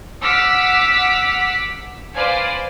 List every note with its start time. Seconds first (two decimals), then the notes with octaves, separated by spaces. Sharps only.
0.22 F#5 D6 E6 F6 B6
2.14 B4 C5 D5 F5 G#5